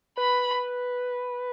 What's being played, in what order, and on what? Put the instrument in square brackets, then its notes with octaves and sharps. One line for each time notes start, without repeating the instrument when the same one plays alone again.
[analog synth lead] B4 [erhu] B5